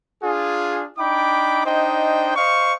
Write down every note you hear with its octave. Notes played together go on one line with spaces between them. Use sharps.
D4 F4 G#4
D4 D#4 G5 B5 D6
D4 D#4 C5 D#5 G5
C5 D#5 F5 C#6